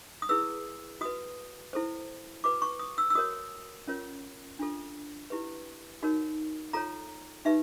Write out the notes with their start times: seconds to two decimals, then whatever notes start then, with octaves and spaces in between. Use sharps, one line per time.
0.22 D#6
0.29 E4 G#4 B4 E6
1.01 F#4 B4 D#6
1.73 E4 A4 C5
2.44 F#4 B4 D6
2.62 C#6
2.79 D#6
2.98 E6
3.10 E6
3.15 F#4 A#4 C#5 D#6
3.87 C#4 F4 A#4 C#5
4.59 D4 F4 A4
5.30 E4 G4 B4
6.03 D#4 F#4 A#4 C#5
6.73 F4 A4 C#5 A#5
7.45 D#4 G4 B4 E5